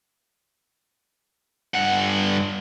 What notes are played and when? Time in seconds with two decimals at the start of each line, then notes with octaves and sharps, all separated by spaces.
1.74 G2 F#5